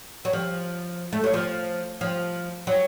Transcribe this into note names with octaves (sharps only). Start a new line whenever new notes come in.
F#3
F3
A3
F#3
F3
F3
F#3